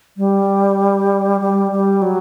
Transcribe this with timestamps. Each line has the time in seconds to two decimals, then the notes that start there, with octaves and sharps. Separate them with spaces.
0.17 G3
1.41 G3
1.72 G3
2.02 F#3